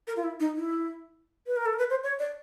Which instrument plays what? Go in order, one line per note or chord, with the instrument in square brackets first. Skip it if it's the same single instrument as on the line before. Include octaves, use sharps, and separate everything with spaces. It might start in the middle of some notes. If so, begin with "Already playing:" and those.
[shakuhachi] A#4
F4
E4
D#4
E4
B4
A#4
A4
A#4
B4
C5
C#5
D5